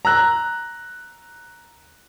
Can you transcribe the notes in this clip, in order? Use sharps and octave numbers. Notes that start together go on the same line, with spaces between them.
A#5 E6 F#6